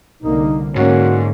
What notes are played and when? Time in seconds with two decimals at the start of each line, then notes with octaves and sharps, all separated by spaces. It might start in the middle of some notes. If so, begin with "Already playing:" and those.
0.23 C2 D3 A#3 D#4
0.76 G#2 D3 A#3 C#4 F#4